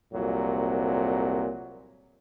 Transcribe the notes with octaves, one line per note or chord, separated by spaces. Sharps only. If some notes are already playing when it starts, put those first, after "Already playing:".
C2 F2 A#2 F#3